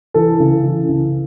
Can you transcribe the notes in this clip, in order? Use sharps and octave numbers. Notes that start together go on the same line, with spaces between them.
E3 A4
C#3
E3
C#3